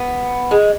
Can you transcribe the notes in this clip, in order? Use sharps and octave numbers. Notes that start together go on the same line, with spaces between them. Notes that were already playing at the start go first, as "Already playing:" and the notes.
Already playing: B3
G#3